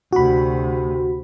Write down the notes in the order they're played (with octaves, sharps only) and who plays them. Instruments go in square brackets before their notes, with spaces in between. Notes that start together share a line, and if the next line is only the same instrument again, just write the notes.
[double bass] D2 C3 [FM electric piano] F#4 B5